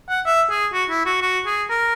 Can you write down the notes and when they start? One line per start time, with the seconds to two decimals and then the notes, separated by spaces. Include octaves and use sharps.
0.09 F#5
0.25 E5
0.50 G#4
0.73 F#4
0.90 E4
1.06 F#4
1.22 F#4
1.46 G#4
1.70 A#4